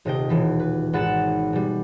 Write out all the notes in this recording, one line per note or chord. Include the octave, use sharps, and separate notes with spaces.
D#1 C3 D#5 G5
D#1 B2 E3 B6
B4
G#1 F#5 B5 A6 E7
B2 G3